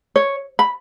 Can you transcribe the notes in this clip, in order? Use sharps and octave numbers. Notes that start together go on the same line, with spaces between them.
C#5
B5